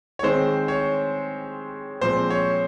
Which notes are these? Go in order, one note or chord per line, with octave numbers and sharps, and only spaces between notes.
C#5
D#3 G#3 C4 C5
C#5
A#2 F3 G#3 C4 C5
C#5